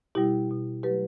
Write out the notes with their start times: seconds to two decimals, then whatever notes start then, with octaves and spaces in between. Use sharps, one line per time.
0.15 B2 G3 E4 G4
0.50 B2 G3
0.83 F#3 A3 G4 B4